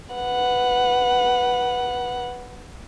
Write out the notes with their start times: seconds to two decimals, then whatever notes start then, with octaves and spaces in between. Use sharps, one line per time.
0.15 B4 F#5